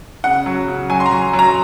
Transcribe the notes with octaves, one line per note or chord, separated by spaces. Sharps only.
C#3 F#5
F#3
C#3
F#3 G#5
C6
A#5
F#3
F#3
A#5